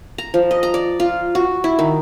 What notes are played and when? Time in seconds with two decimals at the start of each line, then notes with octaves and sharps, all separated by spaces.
0.18 A#5
0.34 F3
0.51 D#5
0.63 A#5
0.74 D5
1.00 F4
1.35 F#4
1.64 E4
1.79 D#3